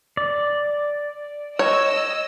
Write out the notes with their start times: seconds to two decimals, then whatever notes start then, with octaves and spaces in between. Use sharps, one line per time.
0.17 D5
1.59 C#5 D#5 E6